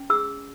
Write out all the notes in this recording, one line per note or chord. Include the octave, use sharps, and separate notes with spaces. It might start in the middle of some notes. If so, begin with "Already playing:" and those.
Already playing: C#4
G#4 E6